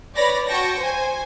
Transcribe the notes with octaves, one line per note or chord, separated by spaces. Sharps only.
B4 C#5 D5 B5 A#6
F#4 G5 A5 C#6 A#6
C5 G#5